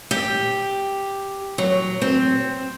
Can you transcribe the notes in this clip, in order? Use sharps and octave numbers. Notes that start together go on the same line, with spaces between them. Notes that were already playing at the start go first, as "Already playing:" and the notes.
G4
F#3
C4